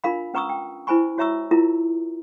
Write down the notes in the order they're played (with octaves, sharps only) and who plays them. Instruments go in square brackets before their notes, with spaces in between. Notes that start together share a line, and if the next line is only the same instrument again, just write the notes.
[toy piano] D4 F4 A#4 F5 B5
C#4 B4 A#5 C#6 D#6 E6
G5
E4 B4 C5 G#5 B5 C#6
F#4 C#5 E5 A#5 C#6 E6
E4 F4 A#4 A#5